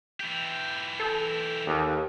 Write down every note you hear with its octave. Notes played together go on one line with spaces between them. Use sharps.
E3 G4
A4
D#2